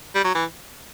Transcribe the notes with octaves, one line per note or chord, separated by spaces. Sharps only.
G3
F#3
E3